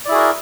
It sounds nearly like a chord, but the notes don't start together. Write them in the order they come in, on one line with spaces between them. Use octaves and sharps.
D5 E4 G#4 F#4 A#4